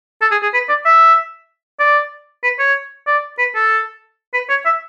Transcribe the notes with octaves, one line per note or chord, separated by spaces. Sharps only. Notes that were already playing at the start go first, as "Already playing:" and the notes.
A4
G#4
G#4
B4
D5
E5
D5
B4
C#5
D5
B4
A4
B4
C#5
E5